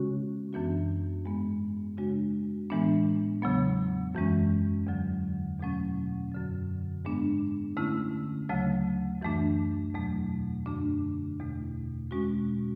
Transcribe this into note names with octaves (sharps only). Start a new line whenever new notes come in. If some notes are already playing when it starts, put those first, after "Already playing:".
Already playing: C#3 G#3 C#4 F#4
F#2 E3 B3 D4 F#4
G#2 G#3 B3
C#3 G#3 D4 F#4
A2 E3 G#3 B3 D4
E2 C#3 F#3 B3
F#2 E3 G#3 C#4
E2 D3 F#3
E2 B2 F#3 A3 C#4
F#2 D3 F#3
G#2 G#3 B3 D4
D3 A3 C#4 E4
D2 C#3 F#3 A3
F#2 E3 A3 D4
E2 B2 F#3 A3
F#2 D3 A3 D4
E2 B2 A3
B2 G#3 C#4 F#4